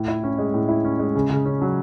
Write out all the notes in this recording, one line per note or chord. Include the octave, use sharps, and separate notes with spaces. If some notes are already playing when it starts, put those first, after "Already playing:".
Already playing: A2
E4
C#4
G#3
A2
E4
C#4
G#3
C#3
C#3
C#4
F#3